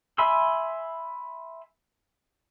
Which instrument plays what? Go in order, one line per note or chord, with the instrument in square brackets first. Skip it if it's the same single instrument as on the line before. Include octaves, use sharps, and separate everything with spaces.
[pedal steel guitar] E5 G#5 B5 C6 E6